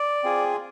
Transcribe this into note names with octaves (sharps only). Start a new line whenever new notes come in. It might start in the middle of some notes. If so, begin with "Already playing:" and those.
Already playing: D5
C4 F4 G#4